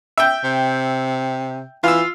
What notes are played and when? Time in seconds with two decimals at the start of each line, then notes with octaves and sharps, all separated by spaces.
0.18 E5 G5
0.44 C3
1.83 E3 F4 E6